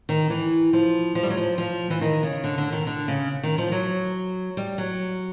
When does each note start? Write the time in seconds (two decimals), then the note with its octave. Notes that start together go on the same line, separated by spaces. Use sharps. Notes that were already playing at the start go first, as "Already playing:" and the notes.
0.09 D#3
0.30 E3
0.73 F3
1.15 F3
1.23 G3
1.30 F#3
1.37 F3
1.58 F3
1.90 E3
2.01 D#3
2.23 C#3
2.44 D3
2.58 D3
2.72 D#3
2.87 D3
3.08 C#3
3.43 D#3
3.58 F3
3.72 F#3
4.57 G3
4.78 F#3